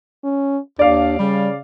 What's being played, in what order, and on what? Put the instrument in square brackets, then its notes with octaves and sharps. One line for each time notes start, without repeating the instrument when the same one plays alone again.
[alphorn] C#4
[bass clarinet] D#2 [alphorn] D4 [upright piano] D5 F5
[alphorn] C#3 [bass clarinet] G3